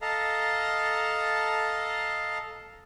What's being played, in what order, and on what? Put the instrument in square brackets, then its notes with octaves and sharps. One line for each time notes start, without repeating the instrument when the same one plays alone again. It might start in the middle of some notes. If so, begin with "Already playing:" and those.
[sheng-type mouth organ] A4 D#5 F5 A5 A#5